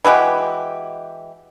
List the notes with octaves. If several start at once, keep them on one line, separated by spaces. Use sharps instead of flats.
E3 G#3 F#4 G4